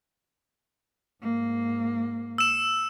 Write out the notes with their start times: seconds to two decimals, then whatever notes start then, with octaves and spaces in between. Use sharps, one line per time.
1.23 G#2 A#3
2.38 E6 E7